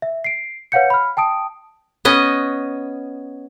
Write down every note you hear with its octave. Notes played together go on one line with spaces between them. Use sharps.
E5
C7 D7
B4 C#5 F5 F#5 G6 C#7
B5 F6
G5 A5 D#6 D7
B3 C#4 D#5